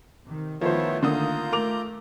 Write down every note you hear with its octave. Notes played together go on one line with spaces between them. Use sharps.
C3 D#3
D#3 F3 A3 B3 E4 C5 C#5
D3 A#3 F4 A#5 D#6 G6
A3 A#4 D6 F7